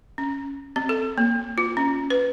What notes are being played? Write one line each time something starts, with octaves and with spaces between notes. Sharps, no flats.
C#4
C4
A4
A#3
F4
C#4
B4